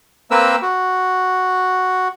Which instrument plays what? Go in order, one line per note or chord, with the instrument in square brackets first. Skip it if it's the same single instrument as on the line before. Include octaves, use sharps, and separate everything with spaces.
[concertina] A#3 C4 A#4 B4 E6
F#4